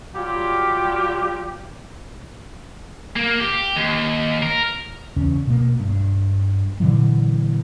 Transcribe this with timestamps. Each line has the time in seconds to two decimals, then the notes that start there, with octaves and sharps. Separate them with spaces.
0.15 F#3 G3 F4 G4
3.16 A#3
3.40 G4
3.76 D#2
4.42 A#4
5.16 E2 C#3 C#4
5.47 B2 A#3
5.80 G2
6.80 A#2 D3 E3 F#3